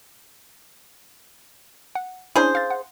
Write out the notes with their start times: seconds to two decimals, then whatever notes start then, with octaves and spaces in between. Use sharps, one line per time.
1.95 F#5
2.36 C#4 D4 E4 G#4 C5
2.55 F5 A6
2.70 F#5